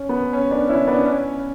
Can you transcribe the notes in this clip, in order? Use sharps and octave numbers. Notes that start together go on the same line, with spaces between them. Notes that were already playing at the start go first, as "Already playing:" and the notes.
Already playing: C#4
B3
C#4
B3 D4
C#4 E4
B3 D4
C#4